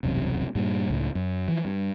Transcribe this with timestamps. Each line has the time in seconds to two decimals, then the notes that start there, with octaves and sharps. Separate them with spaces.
0.03 E1 C2 F#2 C3
0.55 G2 A#2 G3
0.90 C#2 A2
1.15 F#2
1.48 E3 F3
1.65 G2